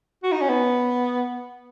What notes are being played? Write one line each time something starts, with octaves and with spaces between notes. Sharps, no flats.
F#4
D#4
C#4
B3